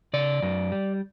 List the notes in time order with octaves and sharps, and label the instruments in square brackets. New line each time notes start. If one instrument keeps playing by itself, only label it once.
[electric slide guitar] C#3 D5
F#2
G3